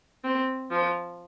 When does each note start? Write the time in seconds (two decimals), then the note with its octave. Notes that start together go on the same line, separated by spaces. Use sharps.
0.24 C4
0.71 F3